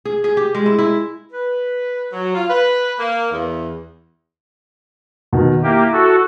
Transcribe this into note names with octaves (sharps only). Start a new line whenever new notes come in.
G#4
G#4
G4
G#3
E4
E4
B4
F#3
F4
B4
A#3
E2
B2 D#3
A#3 E4 G4
F#4 A4